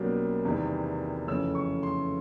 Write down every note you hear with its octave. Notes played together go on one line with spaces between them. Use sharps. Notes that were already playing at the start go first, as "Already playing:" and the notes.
Already playing: B1 B2 G3 A#3 C#4
E2 C3 D#3 G3
F2 C#3 E3 A3 C#4 E6
C#6
C6